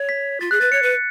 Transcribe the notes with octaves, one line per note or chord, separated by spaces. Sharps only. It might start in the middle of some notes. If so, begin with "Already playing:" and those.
Already playing: C#5
B6
F4 A6
G#4 F#6
B4 A6
C#5 C#7
B4